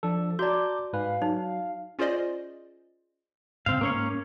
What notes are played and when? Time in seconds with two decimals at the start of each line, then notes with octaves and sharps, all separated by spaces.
0.03 F3 D4 A4
0.39 F#4 D5 A5 A#5 D6 G6
0.93 G#2 B4 F5 G#5
1.22 F#3 D#4
1.99 C#4 F4 G#4 C5 D5 D#5
3.66 G#2 C#3 C4 F5
3.81 G#2 A#3 C#4 C#5